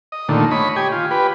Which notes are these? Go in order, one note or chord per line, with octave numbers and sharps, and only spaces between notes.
D#5
A#2 D3 D#3 A3
C#5 D#5 B5
G4 G#5
F4
G4 B4